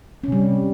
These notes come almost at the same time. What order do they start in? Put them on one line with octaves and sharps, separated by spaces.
C#4 C3 G3